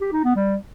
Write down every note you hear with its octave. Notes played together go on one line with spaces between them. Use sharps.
G4
D#4
B3
G3